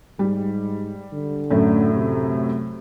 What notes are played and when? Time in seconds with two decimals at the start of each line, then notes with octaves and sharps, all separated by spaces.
0.19 G#2 G3
1.13 D3
1.51 F#2 A2 F#3
1.95 C3